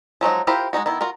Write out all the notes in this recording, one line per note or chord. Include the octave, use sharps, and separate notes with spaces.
F3 F#3 G#3 D#4
E4 F4 G4 A#4 C5
G#3 C#4 D#4 F#4
D#3 B3 E4
F4 F#4 A#4